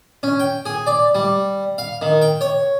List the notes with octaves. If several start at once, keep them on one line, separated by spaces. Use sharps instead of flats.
C#4
G5
G#4
D5
G3
F5
D#3
G5
C#5